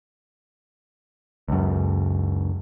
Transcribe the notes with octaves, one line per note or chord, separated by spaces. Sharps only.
C#2 F#2